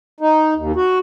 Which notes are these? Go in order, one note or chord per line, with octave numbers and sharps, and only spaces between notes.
D#4
D#2
F#4